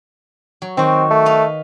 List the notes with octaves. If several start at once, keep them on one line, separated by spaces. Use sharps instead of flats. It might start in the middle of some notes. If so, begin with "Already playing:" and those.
F#3
D#3 C4 F#4
A3
B4 D#5 F5